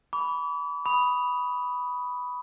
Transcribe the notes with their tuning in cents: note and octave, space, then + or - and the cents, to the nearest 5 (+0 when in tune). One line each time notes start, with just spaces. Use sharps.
B5 +0 D6 -45
B5 +0 D#6 +5